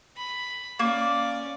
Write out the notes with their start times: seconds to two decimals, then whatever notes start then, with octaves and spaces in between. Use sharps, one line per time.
0.17 B5
0.79 A#3 C#4 D5